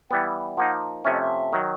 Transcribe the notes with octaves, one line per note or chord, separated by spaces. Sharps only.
E3 G3 B3 G5
F3 A#3 D#4 F#5
C3 F3 A3 C#4 E5
D#5
E5
D#3 F#3